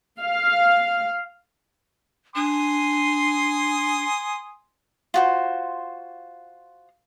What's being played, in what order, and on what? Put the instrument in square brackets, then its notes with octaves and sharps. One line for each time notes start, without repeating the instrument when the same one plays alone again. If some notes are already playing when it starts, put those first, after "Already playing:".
[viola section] F5
[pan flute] D4 [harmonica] G#5 C6 D#6
[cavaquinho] F4 F#4 C5